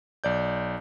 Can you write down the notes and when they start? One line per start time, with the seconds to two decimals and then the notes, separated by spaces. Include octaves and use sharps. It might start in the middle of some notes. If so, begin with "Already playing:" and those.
0.24 B1 D5 G6